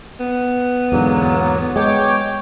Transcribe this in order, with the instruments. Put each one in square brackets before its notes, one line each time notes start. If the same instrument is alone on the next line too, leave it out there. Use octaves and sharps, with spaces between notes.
[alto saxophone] B3
[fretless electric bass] E2 G#2 D3 [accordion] F#3 A#3
[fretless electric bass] G#3 [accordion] C#5 G5 D6